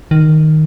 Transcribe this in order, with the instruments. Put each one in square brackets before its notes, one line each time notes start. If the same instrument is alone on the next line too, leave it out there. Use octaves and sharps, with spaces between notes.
[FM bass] D#3